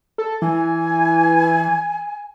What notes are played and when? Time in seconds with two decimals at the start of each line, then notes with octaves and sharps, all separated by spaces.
0.18 A4
0.42 E3 G#5